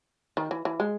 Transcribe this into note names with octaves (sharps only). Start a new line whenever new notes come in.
D#3
E3
E3
G#3